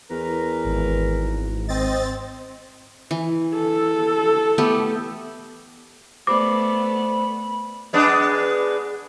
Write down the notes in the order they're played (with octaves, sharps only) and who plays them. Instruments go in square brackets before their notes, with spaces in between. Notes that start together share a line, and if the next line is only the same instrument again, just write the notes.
[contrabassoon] E2 [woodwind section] A#4 B4 A#5
[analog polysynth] G#1
[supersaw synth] C4 A6 [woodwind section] D#5
[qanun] E3
[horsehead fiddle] A4
[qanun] A3 B3 G4
[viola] A3 B3 [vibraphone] C5 D5 [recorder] B5 [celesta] D6
[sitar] G#3 B3 D4